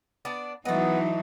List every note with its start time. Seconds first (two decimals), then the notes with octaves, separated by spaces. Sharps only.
0.25 B3 D4 D5
0.65 E3 F#3 A3 B3 D#4 D#5